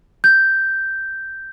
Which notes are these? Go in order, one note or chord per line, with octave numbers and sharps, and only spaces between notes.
G6